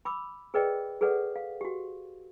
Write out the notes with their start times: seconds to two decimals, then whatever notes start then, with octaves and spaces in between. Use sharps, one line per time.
0.05 B5 D6 E6
0.54 G#4 A#4 B4 D5 D#5 G5
1.01 G#4 A4 B4 D5 F#5
1.36 F5
1.61 F#4 G4